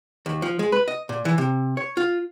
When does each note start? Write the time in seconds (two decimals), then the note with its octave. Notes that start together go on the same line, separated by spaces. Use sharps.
0.26 D#2
0.42 F3
0.59 G#3
0.72 B4
0.88 D#5
1.09 A#2
1.25 E3
1.38 C3
1.77 C#5
1.97 F4